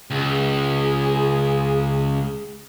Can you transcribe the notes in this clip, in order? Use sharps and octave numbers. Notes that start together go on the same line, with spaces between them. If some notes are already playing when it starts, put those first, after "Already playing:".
C#2 G#4